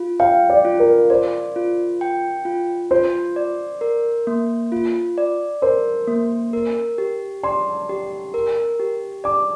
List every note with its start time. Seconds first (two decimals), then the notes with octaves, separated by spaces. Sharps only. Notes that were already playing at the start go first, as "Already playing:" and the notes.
Already playing: F4
0.20 F5 G5
0.50 D5
0.65 F4
0.80 A#4
1.10 C5 D5
1.56 F4
2.01 G5
2.45 F4
2.91 F4 C5
3.36 D5
3.81 A#4
4.27 A#3
4.72 F4
5.18 D5
5.62 A#4 C5
6.07 A#3
6.53 A#4
6.98 G4
7.43 D5 C6
7.89 G4
8.34 A#4
8.80 G4
9.24 D5 D6